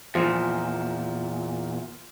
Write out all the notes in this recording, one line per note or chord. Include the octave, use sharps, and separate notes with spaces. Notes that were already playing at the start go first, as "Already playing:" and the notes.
E2 A#2 F3